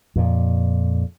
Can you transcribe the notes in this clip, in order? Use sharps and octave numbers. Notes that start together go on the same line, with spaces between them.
F2 A#2